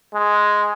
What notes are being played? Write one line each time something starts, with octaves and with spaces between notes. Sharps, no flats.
G#3